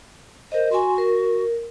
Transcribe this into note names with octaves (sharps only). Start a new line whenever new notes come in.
A#4 C5 D#5
F#4 G#5 C6
A#4